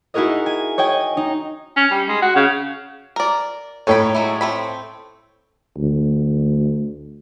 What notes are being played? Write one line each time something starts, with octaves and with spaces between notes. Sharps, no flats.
D#4 E4 F#4 G#4 A#4 D#5
G#5
C#5 D#5 G5 G#5
D#4
C#4
G3
G#3
F#4
C#3
A#4 D5
A2 D#3 A4 C#5 G5 B5
F#3 G#3 E4
A3 C4 B5
D2